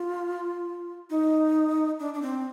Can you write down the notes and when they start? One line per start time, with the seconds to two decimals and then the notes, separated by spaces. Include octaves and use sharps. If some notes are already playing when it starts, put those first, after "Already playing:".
Already playing: F4
1.10 D#4
2.00 D4
2.14 D4
2.22 C4